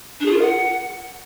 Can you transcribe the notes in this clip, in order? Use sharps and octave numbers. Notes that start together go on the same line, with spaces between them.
D4
G#4
F4
A#4
F#5